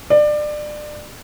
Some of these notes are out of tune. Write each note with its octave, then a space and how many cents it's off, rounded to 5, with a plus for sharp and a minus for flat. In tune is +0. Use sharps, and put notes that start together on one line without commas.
D5 +25